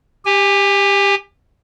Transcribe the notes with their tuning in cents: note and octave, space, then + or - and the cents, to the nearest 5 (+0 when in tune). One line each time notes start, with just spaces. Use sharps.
G4 +15 G#5 -25